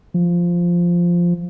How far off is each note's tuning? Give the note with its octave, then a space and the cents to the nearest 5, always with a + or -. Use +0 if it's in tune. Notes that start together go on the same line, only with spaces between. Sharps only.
F3 -5